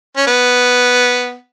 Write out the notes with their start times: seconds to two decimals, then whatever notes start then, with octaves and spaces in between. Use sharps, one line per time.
0.17 C#4
0.27 B3